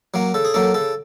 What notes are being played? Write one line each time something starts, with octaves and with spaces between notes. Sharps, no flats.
F#3 A#3 C#4
C#3 A4
G#4
F#3 A#3 C#4 A4
C#3 A4